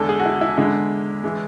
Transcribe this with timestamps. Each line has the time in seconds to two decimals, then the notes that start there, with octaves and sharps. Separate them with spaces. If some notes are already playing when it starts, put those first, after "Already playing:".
Already playing: E2 D3 G#3 A4
0.09 G#4
0.20 F#4
0.25 E4
0.41 E4
0.58 E2 D3 G#3 E4
1.24 E3 G#3